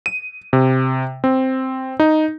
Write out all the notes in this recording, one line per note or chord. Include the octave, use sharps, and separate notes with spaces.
D#7
C3
C4
D#4